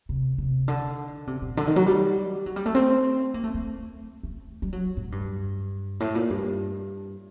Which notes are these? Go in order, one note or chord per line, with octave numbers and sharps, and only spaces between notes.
C3
C3
D3
C3
A#2
D3
D#3
F#3
G3
F#3
G3
A3
C4
A#3
A3
A3
A3
G3
F#3
A2
G2
A2
A#2
G2